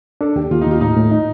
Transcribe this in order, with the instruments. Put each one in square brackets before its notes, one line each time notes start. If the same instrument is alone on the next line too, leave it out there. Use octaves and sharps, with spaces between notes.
[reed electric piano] D4 [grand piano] A4
[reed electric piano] D#2 [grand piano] G4
[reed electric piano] D#2 [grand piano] F4
[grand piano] D#4
[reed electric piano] D#2 [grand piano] F4
[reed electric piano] A2 [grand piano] D#4
[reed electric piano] A2
D#4